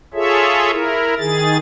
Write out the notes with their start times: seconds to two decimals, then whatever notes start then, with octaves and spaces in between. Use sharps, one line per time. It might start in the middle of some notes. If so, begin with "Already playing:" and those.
0.14 F4 G#4 A4 C#5 E5
0.72 E4 A#4
1.19 D#3 G#4 A6